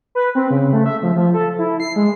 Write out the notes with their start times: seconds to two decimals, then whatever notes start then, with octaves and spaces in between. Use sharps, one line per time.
0.15 B4
0.35 C4
0.50 C#3
0.73 A3
0.86 E5
1.03 F3
1.16 F3
1.34 A4
1.59 E4
1.80 C7
1.96 G#3